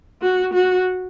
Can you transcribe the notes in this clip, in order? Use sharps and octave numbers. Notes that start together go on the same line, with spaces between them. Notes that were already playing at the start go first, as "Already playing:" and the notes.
F#4
F#4